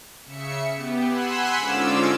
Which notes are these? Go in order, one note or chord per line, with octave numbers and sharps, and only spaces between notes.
C#3 E5 C#7
B3 G4
F#5 G#5 B5 C6 E6 F#6
G#2 D3 C#4 F4 D6 E6